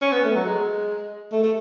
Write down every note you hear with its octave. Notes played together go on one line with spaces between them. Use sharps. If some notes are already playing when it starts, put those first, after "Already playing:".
C#4
B3
A3
F#3
G#3
A3
A3